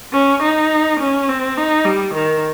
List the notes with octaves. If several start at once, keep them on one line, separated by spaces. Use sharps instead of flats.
C#4
D#4
C#4
C4
D#4
G3
D#3